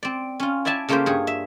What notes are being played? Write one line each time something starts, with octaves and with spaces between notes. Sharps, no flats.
C4 D5
C#4 F4
E4 D5 E5 G#5 A5
C#3 A3 A#3 F4 G4 C5
G2 G#4 C#5
E5